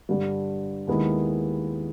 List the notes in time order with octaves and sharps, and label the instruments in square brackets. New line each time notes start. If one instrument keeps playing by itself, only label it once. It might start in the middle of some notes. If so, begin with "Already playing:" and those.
[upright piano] G2 D3 G3
D#2 D#3 G#3 B3 E4